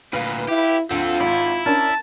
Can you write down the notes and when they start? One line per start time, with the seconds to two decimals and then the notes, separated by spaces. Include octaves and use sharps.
0.13 D2 A#2 B4 F5
0.48 E4 G4
0.91 D2 C4 F4 A4
1.20 G#1 E4
1.66 C#4 D4 A#4 A5